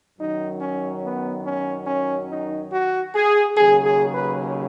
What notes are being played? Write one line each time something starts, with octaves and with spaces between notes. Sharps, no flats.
F#2 D#3 F#3 D#4
C#4
B3
C#4
C#4
D#4
F#4
G#4
D#2 C#3 F#3 G#4
G#4
B4